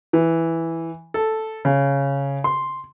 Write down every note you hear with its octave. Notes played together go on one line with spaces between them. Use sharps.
E3
A4
C#3
C6